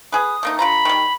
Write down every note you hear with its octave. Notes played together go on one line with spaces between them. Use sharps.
G#4 B4 D#6
A3 A#3 D#4
D3 F4 A#5 B5
D#3 G3